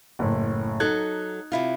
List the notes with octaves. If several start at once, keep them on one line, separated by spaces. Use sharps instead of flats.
F#1 A2
F#3 D#4 A4 F#6 G#6
C3 E4 F4